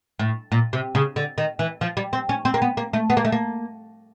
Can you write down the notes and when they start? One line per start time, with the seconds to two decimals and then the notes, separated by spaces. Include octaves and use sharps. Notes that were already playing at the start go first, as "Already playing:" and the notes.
0.19 A2
0.52 A#2
0.73 C3
0.95 C#3
1.16 D3
1.38 D#3
1.59 E3
1.81 F3
1.97 G3
2.13 C4
2.29 C#4
2.45 C4
2.54 A#3
2.62 B3
2.77 A#3
2.93 A3
3.10 B3
3.17 A#3
3.25 A3
3.32 A#3